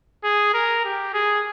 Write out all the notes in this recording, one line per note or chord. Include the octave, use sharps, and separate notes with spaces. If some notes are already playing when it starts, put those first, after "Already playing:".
G#4
A#4
G4
G#4